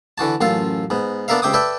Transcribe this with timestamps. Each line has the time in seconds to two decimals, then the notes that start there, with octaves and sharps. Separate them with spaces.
0.18 D3 E3 F#4 A5
0.41 A1 F#2 F4 A4 F5
0.90 G#2 B3
1.28 B3 D4 A4 A#4 E5 F5
1.42 C#2 C3 E5 G5 D6 D#6
1.53 A4 B4 D5 E5 G5